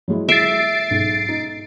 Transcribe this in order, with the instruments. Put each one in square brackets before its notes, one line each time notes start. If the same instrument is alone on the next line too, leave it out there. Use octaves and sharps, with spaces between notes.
[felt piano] F#3 G#3 E4
[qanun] E5 [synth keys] A6 C7 D7
[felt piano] B1 G#2
D#4